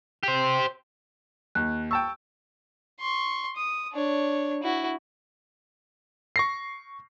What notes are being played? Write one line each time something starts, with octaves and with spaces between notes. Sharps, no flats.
G4 C5
D#2 F#6
G5 A5 C#6 E6
C6 C#6
D#6
D4 C#5
E4 F#4
C#6 A#6 C7